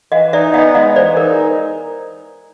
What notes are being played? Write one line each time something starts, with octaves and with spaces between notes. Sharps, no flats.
E3 D#5 F5
D#4 D5 E5
B3 D#5 F5
G#3 D#5 F5
E3 C5 D5
D#4 A#4